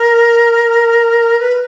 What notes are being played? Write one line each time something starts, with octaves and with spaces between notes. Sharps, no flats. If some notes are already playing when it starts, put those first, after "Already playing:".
Already playing: A#4
B4